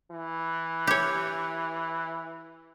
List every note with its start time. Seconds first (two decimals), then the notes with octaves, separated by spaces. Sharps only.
0.11 E3
0.87 G4 C#5